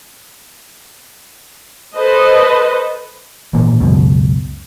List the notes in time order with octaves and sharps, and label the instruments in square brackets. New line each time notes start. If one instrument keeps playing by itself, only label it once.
[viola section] A4 B4 C5 D#5
[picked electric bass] G#1 A#2 E3 A#3
C#2 F#2 B2